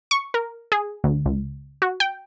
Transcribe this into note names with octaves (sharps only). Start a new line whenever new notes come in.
C#6
A#4
G#4
D2
C#2
F#4
G5